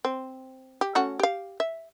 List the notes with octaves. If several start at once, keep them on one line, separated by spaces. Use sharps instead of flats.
C4
G4
A3 C#4 F#4
G4 F5
E5